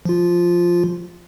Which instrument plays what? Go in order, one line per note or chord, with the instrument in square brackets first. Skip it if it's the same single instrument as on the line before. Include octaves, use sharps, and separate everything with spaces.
[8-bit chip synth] F3 F4